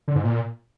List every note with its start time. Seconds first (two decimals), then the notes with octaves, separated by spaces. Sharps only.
0.08 D3
0.16 G#2
0.23 A#2